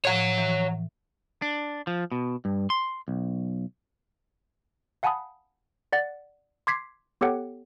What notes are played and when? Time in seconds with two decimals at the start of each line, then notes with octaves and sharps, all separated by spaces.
0.05 A2 F3 C#5 F#5
0.38 E3
1.42 D4
1.87 F3
2.12 B2
2.45 G2
2.70 C6
3.08 B1
5.03 F5 F#5 G#5 A5 B5 D#6
5.93 D5 F#5 A6
6.67 C6 D6 G#6 B6 C7
7.21 B3 G4 A4 C#5 F#5 G5